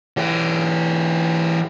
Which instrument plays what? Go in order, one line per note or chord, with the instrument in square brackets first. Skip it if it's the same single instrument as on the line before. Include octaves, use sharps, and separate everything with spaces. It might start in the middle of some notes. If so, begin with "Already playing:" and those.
[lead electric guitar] E3 G4